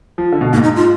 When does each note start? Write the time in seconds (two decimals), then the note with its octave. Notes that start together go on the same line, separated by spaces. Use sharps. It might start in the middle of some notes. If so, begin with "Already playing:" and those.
0.18 F3
0.32 D3
0.41 B2
0.53 G#2 A#3
0.64 D#4
0.76 F4